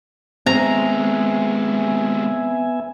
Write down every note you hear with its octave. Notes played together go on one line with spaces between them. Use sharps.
D#2 G#3 B3 C4 E5 G#5 A#5